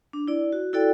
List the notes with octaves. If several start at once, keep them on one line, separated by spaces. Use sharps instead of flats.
D4
E4 D5
F#4
E4 F#4 A4 D5 G5